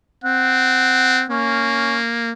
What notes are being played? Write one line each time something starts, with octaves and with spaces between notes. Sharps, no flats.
C4 F#5
A#3 C#4